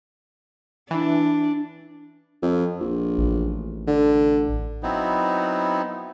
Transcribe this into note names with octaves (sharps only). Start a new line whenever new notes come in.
E3 D4
F2
A#1
A1
D3
F#3 B3 C4 D#4 E4